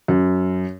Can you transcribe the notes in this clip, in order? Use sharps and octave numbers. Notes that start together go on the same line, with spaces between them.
F#2